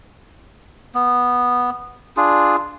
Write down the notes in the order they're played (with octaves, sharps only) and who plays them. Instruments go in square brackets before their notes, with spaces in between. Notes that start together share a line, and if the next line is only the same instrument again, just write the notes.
[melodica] B3
D4 F4 G#4